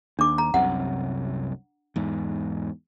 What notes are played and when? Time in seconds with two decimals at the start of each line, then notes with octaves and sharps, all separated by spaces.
0.19 D#2 D4 D6
0.38 A#5
0.54 C2 F#2 C3 F#5
1.96 E2 G#2